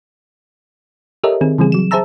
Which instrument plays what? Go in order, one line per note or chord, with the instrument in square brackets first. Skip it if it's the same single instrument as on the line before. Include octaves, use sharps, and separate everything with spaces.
[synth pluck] G4 A4 A#4 C#5 D#5 E5
D#3 C4 G#4
C#3 E3 G3 C4 G#4
F#3 E7
G#4 C5 E5 A5 A#5 E6